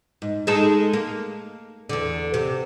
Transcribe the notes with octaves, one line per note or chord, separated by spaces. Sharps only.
G#2
G#3 D#4 A4
A#3
E2 D3
C3